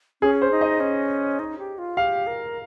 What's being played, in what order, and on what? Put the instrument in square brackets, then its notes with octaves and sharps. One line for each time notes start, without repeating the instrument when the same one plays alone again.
[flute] C#4 [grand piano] G#4
[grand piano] C5
[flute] D#4
[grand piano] D#5
[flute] C#4
D#4
G4
F4
[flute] G4 [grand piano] F5
[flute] A#4